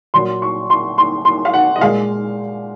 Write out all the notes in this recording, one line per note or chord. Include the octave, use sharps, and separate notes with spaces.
A#2 F#3 C6
C#6
C6
C6
C6
F5
F#5
D#5
A#2 G#3 F5